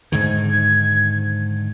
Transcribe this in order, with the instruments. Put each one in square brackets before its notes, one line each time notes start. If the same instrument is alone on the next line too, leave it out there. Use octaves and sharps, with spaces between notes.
[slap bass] G#2 D3 D#3 [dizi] G#6